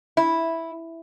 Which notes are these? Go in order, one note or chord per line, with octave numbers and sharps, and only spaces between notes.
E4